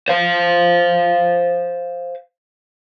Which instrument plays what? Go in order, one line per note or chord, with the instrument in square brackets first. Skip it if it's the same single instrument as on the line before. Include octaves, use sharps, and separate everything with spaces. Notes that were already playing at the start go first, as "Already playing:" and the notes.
[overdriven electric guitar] C5 F5